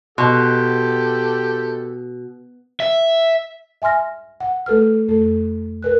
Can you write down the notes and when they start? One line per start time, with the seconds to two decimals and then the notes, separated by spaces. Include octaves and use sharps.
0.18 B2 G4 A4 D#5 C6
2.80 E5
3.82 E5 G#5 C6 F6 A#6
4.40 F#5
4.66 A3 A4 B4 F6
5.08 F2 A3 A4
5.83 A#4 B4 F#6